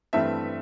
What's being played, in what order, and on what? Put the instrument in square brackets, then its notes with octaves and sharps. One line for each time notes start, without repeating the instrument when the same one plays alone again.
[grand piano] G2 E3 A3 C4 E5